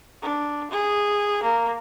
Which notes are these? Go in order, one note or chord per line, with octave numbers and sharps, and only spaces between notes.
D4
G#4
A#3